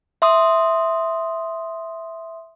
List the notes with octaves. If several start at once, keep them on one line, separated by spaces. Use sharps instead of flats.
E5 C6 D#6